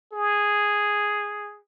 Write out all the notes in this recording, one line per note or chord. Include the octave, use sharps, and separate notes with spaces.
G#4